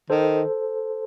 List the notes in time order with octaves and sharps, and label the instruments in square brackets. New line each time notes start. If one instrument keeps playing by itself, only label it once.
[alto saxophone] D#3 [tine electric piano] A4 C5